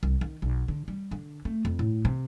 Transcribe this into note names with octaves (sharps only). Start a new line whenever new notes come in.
C2
D#3
B1
D3
G3
D3
A3
F2
A2
C3